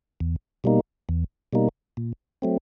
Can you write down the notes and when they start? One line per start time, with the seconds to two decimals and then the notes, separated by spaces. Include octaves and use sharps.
0.20 E2
0.64 B2 G3 A#3 D#4
1.09 E2
1.53 B2 G3 A#3 D#4
1.97 A#2
2.42 F#3 A3 C4